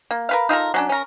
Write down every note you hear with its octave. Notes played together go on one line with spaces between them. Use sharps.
A#3
A#4 B4 F5
D#4 F4 A4 A#4
F#3 C#4 D4
C#4 A#4